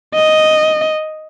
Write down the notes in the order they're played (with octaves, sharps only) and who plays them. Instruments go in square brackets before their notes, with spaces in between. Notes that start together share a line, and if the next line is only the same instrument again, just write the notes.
[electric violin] D#5